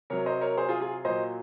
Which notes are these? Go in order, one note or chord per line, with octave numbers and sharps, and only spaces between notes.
C3 F#3 A#4 C#5
C5 D#5
A#4 C#5
G#4 C5
F4 G#4
F4 G#4
A#2 F#3 C5 D#5